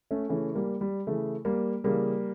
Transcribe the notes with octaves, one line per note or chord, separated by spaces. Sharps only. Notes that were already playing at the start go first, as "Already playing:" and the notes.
A3 C#4
C#3 E3 A3 C#4
G3 A#3
G3
C#3 E3 A3
G3 A#3
C#3 E3 G3 A#3